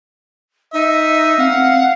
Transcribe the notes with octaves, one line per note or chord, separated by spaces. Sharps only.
D#4 E5
C4 F5 F#5